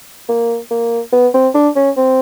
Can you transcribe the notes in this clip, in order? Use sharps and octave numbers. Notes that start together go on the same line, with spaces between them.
A#3
A#3
B3
C4
D4
C#4
C4